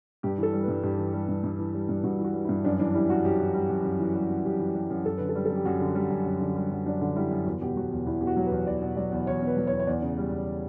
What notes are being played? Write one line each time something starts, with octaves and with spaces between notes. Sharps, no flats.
G2 G4
E3 A4
G3
B4
G2
G2 G4
E3
G3
G2
G2
E3
G3
G2
G2 F#4
E3
F#4
G3
E4
G2
F#2 D4
E3 D4
G3 E4
F#2 F#4
F#2 G4
E3
G3
F#2
F#2
E3
G3
F#2
F#2 G4
E3
G3
F#2
F#2 A4
D3 B4
A4
G3
A4
F#2
G4
F#2 F#4
D3
G3
F#2
F#2
D3
G3
F#2
F#2 D4
D3
G3 E4
F#2
E2 F#4
B2 G4
F#3 F#4
E2
E2 E4
B2 G4
F#4
F#3
B4
E2
E2 D5
B2
F#3 D5
E2
E2 C#5
B2
B4
F#3
C#5
E2
C#5
E2 D5
C#3
G3
E2